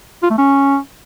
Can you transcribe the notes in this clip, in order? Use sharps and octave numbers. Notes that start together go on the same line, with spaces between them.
F4
A3
C#4